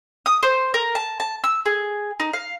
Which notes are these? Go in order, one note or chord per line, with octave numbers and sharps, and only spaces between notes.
D#6
C5
A#4
A5
A5
E6
G#4
D#4
F5